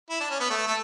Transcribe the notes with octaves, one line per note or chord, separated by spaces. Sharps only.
E4
D4
C#4
B3
A3
A3